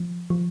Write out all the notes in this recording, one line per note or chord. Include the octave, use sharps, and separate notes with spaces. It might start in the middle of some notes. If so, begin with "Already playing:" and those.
Already playing: F3
F3